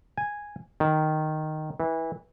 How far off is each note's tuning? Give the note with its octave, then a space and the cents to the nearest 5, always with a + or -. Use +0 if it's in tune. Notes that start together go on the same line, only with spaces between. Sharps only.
G#5 -5
D#3 -5
E3 -20